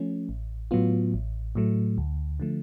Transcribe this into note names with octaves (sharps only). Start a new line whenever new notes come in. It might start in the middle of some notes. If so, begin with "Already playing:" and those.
Already playing: F3 A3 C#4
A1
A2 F#3 B3 F4
A1
A2 F#3 A3
D2
D3 F3 A3